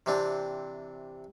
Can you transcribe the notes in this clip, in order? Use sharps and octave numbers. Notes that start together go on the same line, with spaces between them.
C3 E3 C4 D4